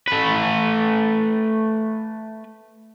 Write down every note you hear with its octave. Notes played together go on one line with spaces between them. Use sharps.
A3 B4